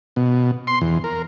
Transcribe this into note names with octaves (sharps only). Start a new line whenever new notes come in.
B2
C6
E2
A#4